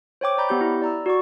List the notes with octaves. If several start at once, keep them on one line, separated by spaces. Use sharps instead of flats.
C5 C#5 G5 D6
D5 A#5 B5 G6
B3 G4 G6
E4
D5 A#5 E6
F#4 D5 C#6